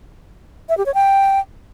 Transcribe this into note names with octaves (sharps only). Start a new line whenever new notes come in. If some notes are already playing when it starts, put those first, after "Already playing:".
E5
G4
C#5
G5